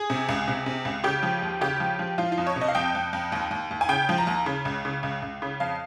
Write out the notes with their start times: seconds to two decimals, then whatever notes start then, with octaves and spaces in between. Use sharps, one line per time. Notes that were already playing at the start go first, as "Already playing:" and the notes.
Already playing: G#4
0.10 C3
0.29 C#2
0.48 C3
0.66 C3
0.85 C#2
1.04 C#3 G4
1.23 F3
1.42 D#2
1.61 C#3 G4
1.80 F3
1.99 F3
2.18 F3 F4
2.32 F4
2.38 F2
2.47 C#5
2.56 C3
2.61 D#5
2.68 F5
2.75 F2 G5
2.95 F2
3.13 F2
3.32 D#2
3.51 D#2
3.71 D#2
3.81 G#5
3.89 C#3 G5
4.09 F3
4.18 A#5
4.27 D#2
4.46 C#3
4.65 C#2
4.85 C#3
5.03 C#2
5.22 C#2
5.42 C#3
5.60 F2 F5